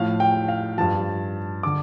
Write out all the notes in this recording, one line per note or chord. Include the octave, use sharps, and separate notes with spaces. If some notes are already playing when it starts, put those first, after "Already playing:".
Already playing: A2 F3 F5
G5
F5
G2 F3 A5
D3 D6